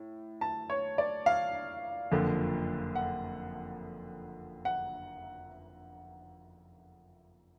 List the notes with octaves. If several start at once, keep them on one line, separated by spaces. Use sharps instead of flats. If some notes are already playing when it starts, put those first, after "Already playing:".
Already playing: A2
A5
C#5
D5
F5
F#1 F2 D3 F3
F#5
F#5